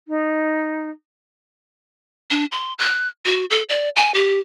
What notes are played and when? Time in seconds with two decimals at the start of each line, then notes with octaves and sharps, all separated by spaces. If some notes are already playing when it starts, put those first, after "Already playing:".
0.08 D#4
2.31 D4
2.52 C6
2.79 F#6
3.25 F#4
3.50 A4
3.69 D5
3.96 G#5
4.14 G4